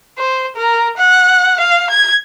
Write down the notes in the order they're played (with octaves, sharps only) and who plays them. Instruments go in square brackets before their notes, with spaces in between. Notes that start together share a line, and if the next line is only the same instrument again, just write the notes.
[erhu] C5
A#4
F#5
F5
G#6